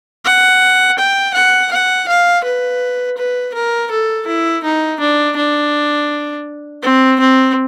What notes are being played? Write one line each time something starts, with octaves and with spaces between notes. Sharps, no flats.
F#5
G5
F#5
F#5
F5
B4
B4
A#4
A4
E4
D#4
D4
D4
C4
C4